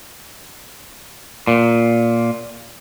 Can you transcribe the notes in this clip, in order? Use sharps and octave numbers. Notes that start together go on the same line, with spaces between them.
A#2